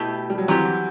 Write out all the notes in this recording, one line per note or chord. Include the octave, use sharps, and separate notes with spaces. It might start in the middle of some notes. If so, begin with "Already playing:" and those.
Already playing: B2 A3 E4 G4
G3
F#3
E3 F#3 C4 G4